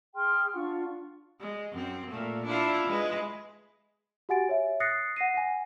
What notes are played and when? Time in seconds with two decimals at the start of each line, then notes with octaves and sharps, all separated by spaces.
0.14 G#4 G5 C6 F6
0.54 D4 F4 F#5 C#6
1.40 G#3
1.72 F#2 C4
2.11 A#2 A3
2.45 D4 E4 F4
2.88 G#3 B4
4.29 F#4 G4 F#5 G#5 A6 D7
4.49 C#5 E5
4.80 D#6 F#6 A6 A#6 C7 C#7
5.16 F#5 A#6 C7 D#7
5.34 F#5 G#5